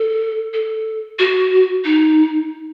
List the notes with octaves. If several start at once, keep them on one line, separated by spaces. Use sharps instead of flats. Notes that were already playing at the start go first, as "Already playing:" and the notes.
Already playing: A4
A4
F#4
D#4